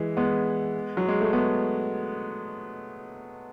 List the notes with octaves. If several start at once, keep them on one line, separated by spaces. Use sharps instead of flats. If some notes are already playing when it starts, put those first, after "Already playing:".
Already playing: E3 G#3
G#3 B3
F#3
G#3
A3
G#3 B3